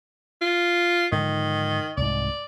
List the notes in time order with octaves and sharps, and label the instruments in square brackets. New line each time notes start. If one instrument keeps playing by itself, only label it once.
[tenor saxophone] F4
[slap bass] G#2 D3 F3 [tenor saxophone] D#3
[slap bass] C2 G#2 [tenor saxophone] D5